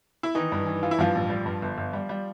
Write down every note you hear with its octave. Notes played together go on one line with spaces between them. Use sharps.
E4
D#3 E3 D#4
G2
E3
E3 F4
E4
G2 F3 F4
A1
G3
G2
G1
G1
G3
G3